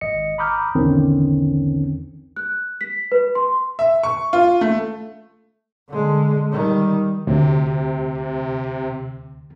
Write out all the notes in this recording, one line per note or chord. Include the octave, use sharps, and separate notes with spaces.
G#1 D#5 C#7
A#5 B5 D6 D#6 F6 G6
B1 E2 D3 D#3 C4 C#4
F#6
B6
B4
C6
E5
C#6
F4
A3
D3 G#3
D#3 G3
D2 C3